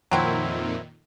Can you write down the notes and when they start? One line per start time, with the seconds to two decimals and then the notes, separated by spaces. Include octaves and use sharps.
0.11 F2 A#2 D#3 F#3 C4 E4